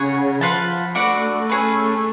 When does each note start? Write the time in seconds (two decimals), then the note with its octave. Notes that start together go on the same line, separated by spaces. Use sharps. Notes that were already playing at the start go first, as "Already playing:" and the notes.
Already playing: C#3 G#4 C#5 F#5
0.41 F3 F4 B4 F#5 A5
0.95 A3 D4 F#4 B4 D5
1.50 C#4 G#4 B4